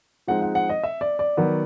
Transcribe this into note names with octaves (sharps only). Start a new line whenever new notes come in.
F3 G#3 C4 D#4 F#5
F#5
F#5
D#5
E5
D5
D5
D#3 F#3 B3